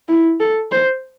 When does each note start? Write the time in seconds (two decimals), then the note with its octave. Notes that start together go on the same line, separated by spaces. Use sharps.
0.08 E4
0.40 A4
0.72 C5